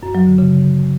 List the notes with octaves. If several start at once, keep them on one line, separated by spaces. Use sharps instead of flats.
F#2
F#3
D3
C#3